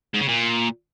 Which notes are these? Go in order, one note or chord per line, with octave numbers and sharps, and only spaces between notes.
G#2
C#3
A#2